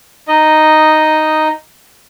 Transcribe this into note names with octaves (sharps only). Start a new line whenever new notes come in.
D#4 D#5